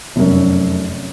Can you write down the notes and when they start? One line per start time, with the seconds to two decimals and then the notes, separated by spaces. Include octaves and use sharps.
0.16 F1 F#2